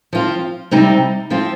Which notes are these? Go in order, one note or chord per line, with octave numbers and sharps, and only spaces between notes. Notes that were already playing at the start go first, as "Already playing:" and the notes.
F3 C4 F4
C3 G3 C4 D#4
F3 C4 F4